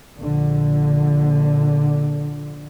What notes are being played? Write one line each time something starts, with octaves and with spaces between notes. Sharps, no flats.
A#1 D3